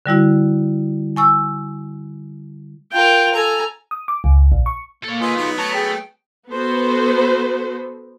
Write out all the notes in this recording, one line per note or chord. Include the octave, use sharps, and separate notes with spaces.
D3 G3 E4 F#4
G#5 C#6 E6
F4 A#4 G5
A4 G#5 A#5
D#6
D6
C#2
A#1
C#6
A#3 A4 C#5
G#3 A3 F4 B4 D#5 G#5
F#3 B3 D#4
A3 C#5 A5 A#5
G#4 G5
B3 F#4 A4 B4 C5